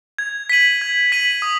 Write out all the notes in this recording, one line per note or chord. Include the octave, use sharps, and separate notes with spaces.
G#6
B6 D#7 F#7
G#6
B6 D#7 F#7
D#6